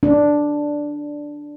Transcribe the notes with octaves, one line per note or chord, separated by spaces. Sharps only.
D4